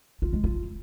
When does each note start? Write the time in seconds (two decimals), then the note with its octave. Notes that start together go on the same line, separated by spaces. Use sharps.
0.22 F4
0.33 G#3
0.44 F4